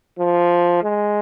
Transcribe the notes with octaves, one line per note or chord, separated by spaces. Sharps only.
F3
G#3